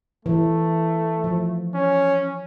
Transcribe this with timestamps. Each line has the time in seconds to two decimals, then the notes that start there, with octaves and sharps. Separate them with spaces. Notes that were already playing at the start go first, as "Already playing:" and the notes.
0.25 E3 A3
1.24 F3
1.74 C#4